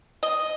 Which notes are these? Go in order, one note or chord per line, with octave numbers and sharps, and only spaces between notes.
D#5